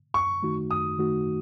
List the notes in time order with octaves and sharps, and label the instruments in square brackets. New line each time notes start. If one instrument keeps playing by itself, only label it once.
[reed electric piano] F#2 [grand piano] C#6
[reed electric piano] D#3 A3 D#4 F#4
[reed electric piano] F#2 [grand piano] D#6
[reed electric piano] D#3 A3 D#4 F#4